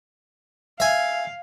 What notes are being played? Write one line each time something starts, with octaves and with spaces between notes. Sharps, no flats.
E5 F5 G#5